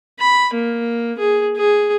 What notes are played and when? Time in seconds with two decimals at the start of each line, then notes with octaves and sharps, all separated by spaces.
0.20 B5
0.54 A#3
1.18 G#4
1.57 G#4